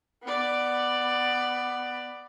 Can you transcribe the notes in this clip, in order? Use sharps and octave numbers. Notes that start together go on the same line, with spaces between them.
B3 D5